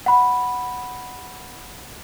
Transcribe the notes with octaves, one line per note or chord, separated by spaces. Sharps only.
F#5 B5